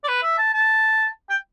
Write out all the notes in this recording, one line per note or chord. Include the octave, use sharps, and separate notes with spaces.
D5
B4
E5
A5
A5
G5